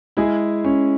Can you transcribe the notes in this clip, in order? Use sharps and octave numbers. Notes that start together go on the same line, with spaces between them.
G#3 E4 G#4
C#4